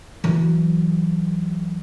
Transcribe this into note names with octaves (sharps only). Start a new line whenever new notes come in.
E3 F#3